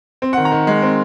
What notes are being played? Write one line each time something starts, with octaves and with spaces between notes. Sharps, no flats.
C4
F#5
D#3
A#5
D#3
G#3
C4